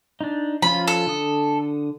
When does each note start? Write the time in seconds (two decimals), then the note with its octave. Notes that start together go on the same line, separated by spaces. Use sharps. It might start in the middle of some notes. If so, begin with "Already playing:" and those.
0.21 D4 D#4
0.62 F3 C#4 F4 B5
0.87 A4
1.07 D3 D#6